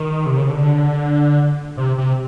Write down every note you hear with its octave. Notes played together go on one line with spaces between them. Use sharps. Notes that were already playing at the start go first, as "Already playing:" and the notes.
Already playing: D#3
C3
C#3
D3
C3
C3